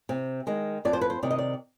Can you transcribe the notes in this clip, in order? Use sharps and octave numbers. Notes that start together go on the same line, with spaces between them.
C3
D#3 G#3
F2 D5
C5
B4
C5
C3 D#3 D5
D#5
D5